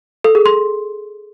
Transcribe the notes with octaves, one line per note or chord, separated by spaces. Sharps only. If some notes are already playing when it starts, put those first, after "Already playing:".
A4
G#4
C6